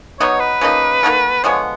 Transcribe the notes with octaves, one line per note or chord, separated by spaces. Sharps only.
B2 F#3 B3 D#4 C#5
B4
C#3 F3 A#3 D#4
A#3 D#4 F#4 A4
D3 F3 G#3 B3 C#5